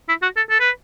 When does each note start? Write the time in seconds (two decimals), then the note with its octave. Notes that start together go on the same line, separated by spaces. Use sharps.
0.09 E4
0.22 F#4
0.37 A4
0.50 A4
0.60 B4